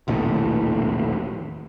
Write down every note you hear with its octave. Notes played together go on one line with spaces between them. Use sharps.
E1 A#1 D#2 A2